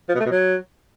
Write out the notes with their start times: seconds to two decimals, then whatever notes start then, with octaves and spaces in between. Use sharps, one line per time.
0.09 F3
0.14 B2
0.20 A3
0.25 B2
0.31 F#3